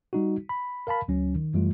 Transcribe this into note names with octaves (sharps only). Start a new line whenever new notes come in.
G3 D#4 F#4
B5
A#4 F5 A5 B5
D2 F#3 C#4
D#3
F#2 E3 G3 A3 F4